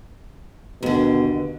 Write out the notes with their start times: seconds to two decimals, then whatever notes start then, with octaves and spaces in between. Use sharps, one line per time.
0.83 D#2 B2 D3